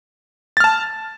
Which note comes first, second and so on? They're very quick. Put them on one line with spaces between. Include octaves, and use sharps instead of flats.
A6 F6 A5